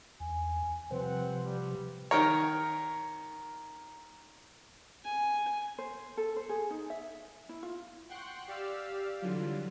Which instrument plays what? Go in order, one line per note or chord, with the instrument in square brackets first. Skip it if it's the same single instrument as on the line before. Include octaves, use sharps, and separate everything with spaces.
[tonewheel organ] E2 [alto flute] G#5
[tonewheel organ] C3 F3 [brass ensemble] G3 C4 F#5 [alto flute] B4
[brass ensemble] G3
[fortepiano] D#3 A#4 C#5 [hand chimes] A#5
[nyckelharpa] G#5
[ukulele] C5
A4
C5
G#4
D#4
E5
E4
F4
[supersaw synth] F#5 G5 C6 C#6 F#6
G4 D5 F5 E6
D3 E3 F#3 G3 F4